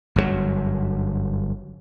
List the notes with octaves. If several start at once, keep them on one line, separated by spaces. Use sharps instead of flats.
G1 F#2 A2 F#3